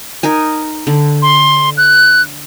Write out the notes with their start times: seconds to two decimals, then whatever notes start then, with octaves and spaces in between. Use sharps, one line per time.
0.23 D#4 A#4 G#5
0.87 D3
1.22 C6
1.77 F#6